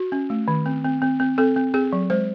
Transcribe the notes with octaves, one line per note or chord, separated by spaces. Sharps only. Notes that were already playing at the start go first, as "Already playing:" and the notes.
Already playing: F#4
C#4
A3
D#3
C4
C4
C4
C4
C4 A4
C4
C4 G#4
F#3
G#3 C5